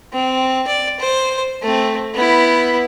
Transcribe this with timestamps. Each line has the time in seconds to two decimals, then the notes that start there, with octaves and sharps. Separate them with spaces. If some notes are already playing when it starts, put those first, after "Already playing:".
0.13 C4
0.67 D5
1.00 C5
1.62 A3 C4
2.14 B3 E4